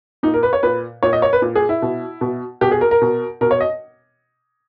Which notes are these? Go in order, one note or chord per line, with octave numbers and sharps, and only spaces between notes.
A#2 D#4
A#4
B4
C#5
A#2 B4
A#2 C#5
D#5
C#5
B4
A#2
G#4
E4
B2
B2
B2 G4
G#4
A#4
A#4
B2
B2 A#4
C#5
D#5